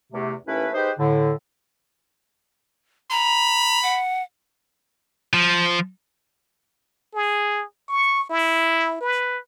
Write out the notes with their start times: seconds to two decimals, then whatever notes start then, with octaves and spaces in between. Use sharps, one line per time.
0.13 E2 C3 A3
0.47 D#2 A3 C#4 E4 B4
0.74 D#4 G4 G#4 B4 C5
0.99 A2 D3
3.11 A#5 B5
3.83 F#5
5.34 F3
7.14 G#4
7.88 C#6
8.29 E4
9.01 B4